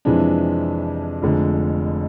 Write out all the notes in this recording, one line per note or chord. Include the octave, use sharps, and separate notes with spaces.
F2 C3 E3 G#3 D4
F1 F2 D3 G#3